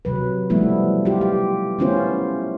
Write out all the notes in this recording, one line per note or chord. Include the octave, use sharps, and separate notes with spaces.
C3 F#3 B4
F3 G3 A3 B3 E4
F4 G4
G4
A3 B3 C#4 E4 F4 C5